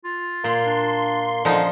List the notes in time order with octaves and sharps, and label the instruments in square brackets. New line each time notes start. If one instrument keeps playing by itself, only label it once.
[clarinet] F4
[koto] A#2 [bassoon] A#3 [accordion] C6
[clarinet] D4
[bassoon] D3 [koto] F3 D#4 [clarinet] C#4